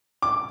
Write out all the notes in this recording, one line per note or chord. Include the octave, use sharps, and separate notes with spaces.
D6